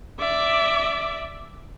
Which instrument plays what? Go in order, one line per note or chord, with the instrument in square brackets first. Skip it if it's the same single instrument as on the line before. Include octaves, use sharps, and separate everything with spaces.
[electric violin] D5 E5